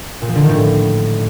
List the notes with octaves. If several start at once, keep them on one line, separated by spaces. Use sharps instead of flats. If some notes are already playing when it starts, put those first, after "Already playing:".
A#2
F3
D3
D#3
A2